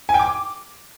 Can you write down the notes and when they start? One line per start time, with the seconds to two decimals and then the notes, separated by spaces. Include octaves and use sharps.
0.09 G#5
0.14 G5
0.20 D6